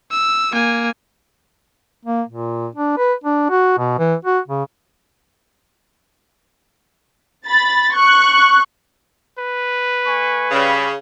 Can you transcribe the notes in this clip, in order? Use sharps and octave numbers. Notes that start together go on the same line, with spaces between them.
E6
A#3 G#5
A#3
A#2
D4
B4
D4
F#4
B2
E3
F#4
C#3
B5 A6
C#6 F#6
B4
A3 G#5 C#6
C#3 G3 B5